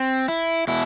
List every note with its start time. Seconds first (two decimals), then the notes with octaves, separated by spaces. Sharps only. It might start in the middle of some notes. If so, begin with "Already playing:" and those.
Already playing: C4
0.28 E4
0.67 B2 E4